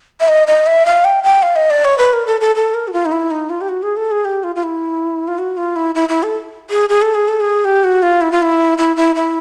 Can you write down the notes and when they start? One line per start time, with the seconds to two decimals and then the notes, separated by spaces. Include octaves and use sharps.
0.20 E5
0.28 D#5
0.47 D#5
0.67 E5
0.86 F5
1.05 G5
1.24 G5
1.43 F5
1.56 D#5
1.70 D5
1.85 C#5
1.98 B4
2.13 A#4
2.27 A4
2.41 A4
2.56 A4
2.74 A#4
2.88 F#4
2.93 F4
3.06 D#4
3.12 E4
3.31 D#4
3.50 F4
3.61 G4
3.69 F#4
3.83 G#4
3.97 A4
4.11 G#4
4.25 G4
4.44 F4
4.56 F4
4.63 E4
5.28 F4
5.38 F#4
5.57 F4
5.76 E4
5.95 E4
6.09 E4
6.23 A4
6.70 G#4
6.89 G#4
7.02 A4
7.15 G#4
7.28 A4
7.41 G#4
7.65 G4
7.84 F#4
8.03 F4
8.21 E4
8.32 F4
8.42 E4
8.78 E4
8.96 E4
9.15 E4